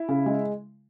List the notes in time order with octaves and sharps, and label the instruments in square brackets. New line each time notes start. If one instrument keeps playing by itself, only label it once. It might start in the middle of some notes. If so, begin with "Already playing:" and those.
Already playing: [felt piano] E4
C#3
G#3